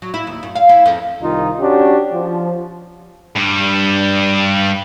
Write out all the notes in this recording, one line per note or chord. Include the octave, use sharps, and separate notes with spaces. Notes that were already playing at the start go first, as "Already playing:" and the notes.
F#3
E4
D#2
F#2
F5
E4
F2
C2 D#3 D#4 F4
C#4 D4 F#4 G4
F3
G2 G3